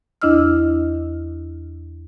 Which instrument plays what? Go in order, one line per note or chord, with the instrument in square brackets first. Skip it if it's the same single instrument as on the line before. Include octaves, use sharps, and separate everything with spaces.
[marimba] E2 D4 E4 D#5 E6 F6